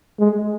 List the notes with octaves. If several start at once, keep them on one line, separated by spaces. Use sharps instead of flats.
G#3